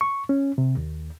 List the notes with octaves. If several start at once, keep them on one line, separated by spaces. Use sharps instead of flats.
C#6
C#4
C3
D#2